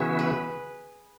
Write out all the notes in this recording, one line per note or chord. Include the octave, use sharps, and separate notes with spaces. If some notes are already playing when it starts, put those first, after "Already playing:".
Already playing: C#3 E3 B3 F#4 G#4 E5
B4